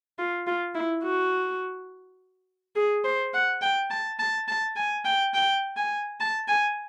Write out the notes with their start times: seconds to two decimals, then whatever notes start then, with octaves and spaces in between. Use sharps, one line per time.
0.19 F4
0.47 F4
0.75 E4
1.04 F#4
2.76 G#4
3.05 C5
3.34 F#5
3.62 G5
3.91 A5
4.19 A5
4.48 A5
4.76 G#5
5.05 G5
5.34 G5
5.77 G#5
6.21 A5
6.48 G#5